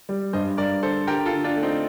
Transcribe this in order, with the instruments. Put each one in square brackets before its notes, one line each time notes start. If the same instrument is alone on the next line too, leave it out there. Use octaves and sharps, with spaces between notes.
[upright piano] G3
[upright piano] G2 [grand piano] C5 D#5
[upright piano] G2 [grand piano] A#4 D5
[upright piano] D3 [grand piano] A4 C5
[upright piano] D3 [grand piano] G4 A#4
[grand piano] F4 A4
[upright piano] D3
[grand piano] D4 F4
[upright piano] A3
[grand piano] C4 D#4